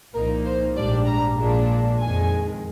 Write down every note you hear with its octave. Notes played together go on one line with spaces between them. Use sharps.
C2 A#2 F3 A#3 D#4 A#4
C5
A#1 G#2 G3 D4 D5
A#5
A#1 A#2 G#3 D4
F2 D#3 G#3 G#5